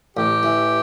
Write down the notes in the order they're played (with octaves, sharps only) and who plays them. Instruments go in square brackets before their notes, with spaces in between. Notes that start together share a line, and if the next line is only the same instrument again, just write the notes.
[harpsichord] A1 [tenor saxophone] G4
[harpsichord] E3